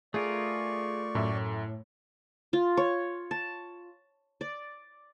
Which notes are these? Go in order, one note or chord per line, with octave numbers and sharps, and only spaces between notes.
A3 F4 G#4 A#4 D5 C#6
F#2 A2 E5
F4
C#5
A5
D5